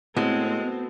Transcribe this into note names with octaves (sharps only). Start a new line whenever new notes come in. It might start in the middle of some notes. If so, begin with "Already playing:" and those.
A2 G#3 B3 C4 F#4 A4